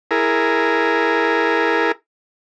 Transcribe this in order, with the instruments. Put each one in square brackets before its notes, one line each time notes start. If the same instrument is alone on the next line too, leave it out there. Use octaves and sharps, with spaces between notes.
[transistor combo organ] E4 G#4 A#4